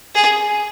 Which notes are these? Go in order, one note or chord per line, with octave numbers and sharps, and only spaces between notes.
G#4